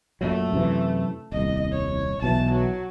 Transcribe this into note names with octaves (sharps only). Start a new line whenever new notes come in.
F#2 A#2 F#3 A3
F#2 C3 E3
D#1 C2 D#5
C#5
B1 B2 E3 A5
F#3